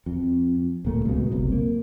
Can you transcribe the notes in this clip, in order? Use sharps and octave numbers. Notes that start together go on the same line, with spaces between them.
F2
D1 A#2 A3
C#2 B2
F#1 C2
A#3